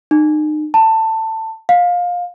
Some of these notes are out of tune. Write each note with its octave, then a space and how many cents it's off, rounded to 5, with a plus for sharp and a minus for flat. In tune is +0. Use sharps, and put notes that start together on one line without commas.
D#4 -35
A5 +15
F5 +20